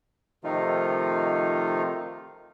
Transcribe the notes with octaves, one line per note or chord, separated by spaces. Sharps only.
C3 D#3 F3 A3 D#4 F4